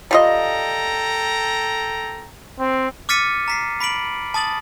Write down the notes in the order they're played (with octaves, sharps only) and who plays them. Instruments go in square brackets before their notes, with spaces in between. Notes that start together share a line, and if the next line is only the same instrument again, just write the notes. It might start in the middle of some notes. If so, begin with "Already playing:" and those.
[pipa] G3 F4 D#5 [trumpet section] A4 G5 A#5
[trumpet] C4
[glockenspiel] D6 F6 A6 B6 C#7 D#7
A#5 B6 C7
B5 B6 D7 F#7
A5 D#6 A6 F#7